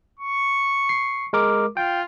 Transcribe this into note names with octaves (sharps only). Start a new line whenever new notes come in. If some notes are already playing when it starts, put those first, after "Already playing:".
C#6
C7
G#3 A#4 D6
F4 G5